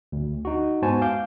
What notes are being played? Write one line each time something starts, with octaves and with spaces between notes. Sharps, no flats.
D2
D#4 F#4
G#2 B3 F#4 C5 G#5 A5
F5 D6 G6